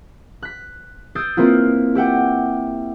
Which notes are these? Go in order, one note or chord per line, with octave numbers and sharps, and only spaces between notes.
F#6 B6
D#6 E6 G6 A6 C7 D7
A#3 C4 E4 F4
G4 E5 F#5 G5